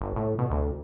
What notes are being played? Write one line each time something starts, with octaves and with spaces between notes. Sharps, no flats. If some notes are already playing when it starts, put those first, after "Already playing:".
G1
A2
B2
D2